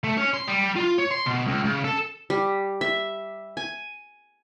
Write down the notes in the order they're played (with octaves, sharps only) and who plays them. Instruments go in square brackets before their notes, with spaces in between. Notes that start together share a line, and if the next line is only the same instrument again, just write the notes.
[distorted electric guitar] A3
C#4
C6
G3
F4
C#5
C6
B2
C#2
C#3
A4
[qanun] G3
E5
G#5